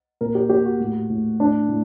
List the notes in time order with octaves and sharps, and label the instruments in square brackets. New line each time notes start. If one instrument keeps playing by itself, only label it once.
[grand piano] A#2 A#4
G4
A#2 G4
F#4
A2
A2
A2 D4
A2